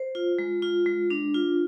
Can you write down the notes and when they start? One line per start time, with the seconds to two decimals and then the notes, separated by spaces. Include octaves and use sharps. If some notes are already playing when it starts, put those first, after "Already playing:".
Already playing: C5
0.15 F4
0.39 G#3
0.62 F4
0.86 G#3
1.10 D4
1.34 F4